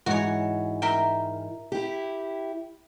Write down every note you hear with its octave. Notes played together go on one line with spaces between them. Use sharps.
G#2 E3 F#4 C#5
A#4 E5 G5
E4 G4